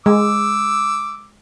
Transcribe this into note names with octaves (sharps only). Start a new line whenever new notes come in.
G#3 D6 E6